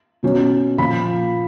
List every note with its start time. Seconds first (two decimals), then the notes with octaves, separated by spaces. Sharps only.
0.23 B2 F#3 C#4
0.78 A#2 F3 A#3 B5